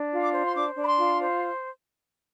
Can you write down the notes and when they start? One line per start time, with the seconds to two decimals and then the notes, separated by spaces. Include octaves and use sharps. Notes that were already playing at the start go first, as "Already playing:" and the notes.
Already playing: D4
0.12 F4
0.22 D6
0.33 C5
0.46 C6
0.55 D4 D6
0.76 D4
0.83 B5
0.87 C6
0.98 F4
1.19 C5